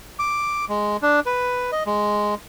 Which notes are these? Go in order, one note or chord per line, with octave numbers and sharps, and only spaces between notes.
D6
G#3
D4
B4
D#5
G#3